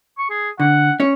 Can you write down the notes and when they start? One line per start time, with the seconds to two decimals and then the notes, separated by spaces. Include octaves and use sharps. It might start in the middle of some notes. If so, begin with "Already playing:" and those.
0.18 C#6
0.30 G#4
0.60 D3 F#5
1.00 C#4 C#5